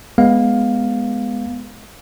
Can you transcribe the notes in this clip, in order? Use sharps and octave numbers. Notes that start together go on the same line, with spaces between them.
G#3 B3 F5